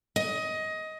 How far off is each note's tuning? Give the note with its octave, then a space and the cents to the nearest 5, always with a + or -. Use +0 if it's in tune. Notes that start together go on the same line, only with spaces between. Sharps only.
D#5 +20